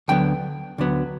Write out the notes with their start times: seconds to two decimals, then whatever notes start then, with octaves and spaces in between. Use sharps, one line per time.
0.08 D2 D3 F#3 B3 G5
0.78 D2 D3 F#3 B3